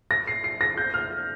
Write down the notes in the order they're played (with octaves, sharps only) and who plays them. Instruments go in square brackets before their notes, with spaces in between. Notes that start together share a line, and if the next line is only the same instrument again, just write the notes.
[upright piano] A#6
C7
C7
A#6
G6
F6